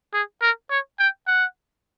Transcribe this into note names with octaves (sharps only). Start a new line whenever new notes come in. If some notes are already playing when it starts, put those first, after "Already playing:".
G#4
A#4
C#5
G5
F#5